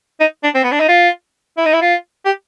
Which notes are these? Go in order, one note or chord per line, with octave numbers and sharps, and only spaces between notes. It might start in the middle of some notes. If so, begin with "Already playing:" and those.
D#4
D4
C4
B3
D4
D#4
F4
E4
D#4
E4
F4
G4